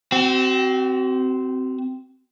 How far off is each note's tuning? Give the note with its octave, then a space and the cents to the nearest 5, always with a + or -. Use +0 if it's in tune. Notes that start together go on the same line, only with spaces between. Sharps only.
C4 -10 F#4 +35